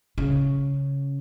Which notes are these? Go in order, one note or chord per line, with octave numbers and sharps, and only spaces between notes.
C#3